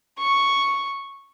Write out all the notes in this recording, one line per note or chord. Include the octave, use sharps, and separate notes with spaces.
C#6